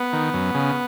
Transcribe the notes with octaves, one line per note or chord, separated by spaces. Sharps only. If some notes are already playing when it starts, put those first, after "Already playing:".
Already playing: B3
D#3
F#2
C#3